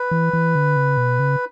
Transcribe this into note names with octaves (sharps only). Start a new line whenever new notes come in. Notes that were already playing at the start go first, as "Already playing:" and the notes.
Already playing: B4
E3
E3
D3
C#3
B2
C#3